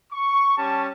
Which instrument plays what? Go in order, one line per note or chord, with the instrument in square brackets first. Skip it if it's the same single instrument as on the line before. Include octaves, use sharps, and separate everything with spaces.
[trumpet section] C#6
G3 C#4 G4 A5